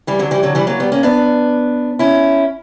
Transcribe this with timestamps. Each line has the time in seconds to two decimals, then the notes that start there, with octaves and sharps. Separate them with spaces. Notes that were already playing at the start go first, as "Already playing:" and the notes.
0.07 E3 G3
0.19 D3 F#3
0.31 E3 G3
0.43 D3 F#3
0.55 E3 G3
0.67 F#3 A#3
0.80 G3 B3
0.92 A#3 C#4
1.03 B3 D4
1.99 C#4 E4